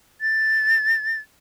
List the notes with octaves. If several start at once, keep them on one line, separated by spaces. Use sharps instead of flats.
A6